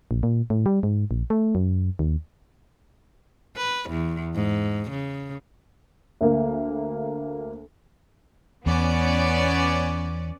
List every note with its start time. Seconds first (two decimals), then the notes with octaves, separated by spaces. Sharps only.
0.11 A#1
0.23 A#2
0.50 A2
0.66 G3
0.83 G#2
1.11 A#1
1.30 A3
1.55 F#2
1.99 D#2
3.57 B4
3.90 E2
4.35 G#2
4.90 C#3
6.21 D2 A#3
8.66 E2 B3 C#4 D5